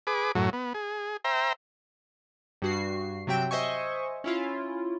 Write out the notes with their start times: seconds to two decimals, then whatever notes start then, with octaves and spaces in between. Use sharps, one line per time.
0.07 G#4 B4 D6
0.35 F#2 A2 F#3
0.53 B3
0.74 G#4
1.24 C5 E5 G5 A#5
2.62 G2 F#4 C7
3.27 C3 F#3 C4 E5 G5 D7
3.51 C5 D#5 E5 G#5 C#6
4.24 C#4 E4 F4